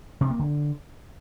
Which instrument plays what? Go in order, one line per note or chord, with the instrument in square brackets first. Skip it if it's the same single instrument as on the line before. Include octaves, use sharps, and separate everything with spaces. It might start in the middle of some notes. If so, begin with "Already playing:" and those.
[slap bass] C3
A#3
D3